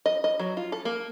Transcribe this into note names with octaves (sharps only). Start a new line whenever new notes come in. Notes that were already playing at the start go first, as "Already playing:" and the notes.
D#5
D#5
F#3
F4
A4
A#3